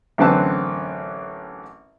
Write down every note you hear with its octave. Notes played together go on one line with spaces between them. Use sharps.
A1 F#2 D3 C4 B4 A5